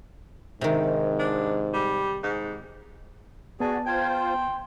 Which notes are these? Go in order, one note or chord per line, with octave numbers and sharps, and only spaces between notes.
G#2 C3 D#3
D4
G3
G#2
B3 F#4 G#4 D5 A5
F4 C5 G5 G#6
C6